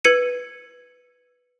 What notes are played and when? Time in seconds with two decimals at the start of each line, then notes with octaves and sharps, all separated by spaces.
0.05 B4 G#6 C#7 D#7